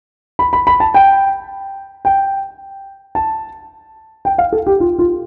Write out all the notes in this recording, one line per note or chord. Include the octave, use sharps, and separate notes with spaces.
B5
B5
B5
A5
G5
G5
A5
G5
F5
A4
G4
F4
F4